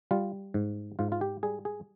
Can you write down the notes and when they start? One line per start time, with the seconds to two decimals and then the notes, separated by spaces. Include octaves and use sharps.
0.11 G3 F4
0.54 G#2
0.99 G#2 F4
1.12 F4
1.21 G4
1.43 G3 G#4
1.65 G#4